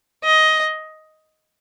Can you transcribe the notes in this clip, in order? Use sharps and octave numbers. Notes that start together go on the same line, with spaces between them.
D#5